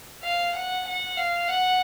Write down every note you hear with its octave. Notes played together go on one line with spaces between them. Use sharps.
F5
F#5
F#5
F5
F#5